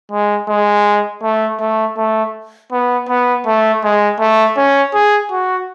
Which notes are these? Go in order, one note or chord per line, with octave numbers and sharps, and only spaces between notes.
G#3
G#3
A3
A3
A3
B3
B3
A3
G#3
A3
C#4
G#4
F#4